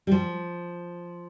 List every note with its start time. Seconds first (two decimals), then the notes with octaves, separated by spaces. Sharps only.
0.07 G3
0.12 F3